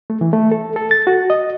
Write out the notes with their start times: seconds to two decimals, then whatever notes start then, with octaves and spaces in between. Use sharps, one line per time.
0.10 A3
0.21 E3
0.33 A3
0.52 A4
0.76 A4
0.91 A6
1.07 F#4
1.30 D#5